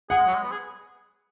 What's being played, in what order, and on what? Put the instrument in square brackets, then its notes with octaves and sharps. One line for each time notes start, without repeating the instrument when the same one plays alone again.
[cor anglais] G#4 [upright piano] F#5
[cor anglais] G#3
F#3
G#3
B3
G#4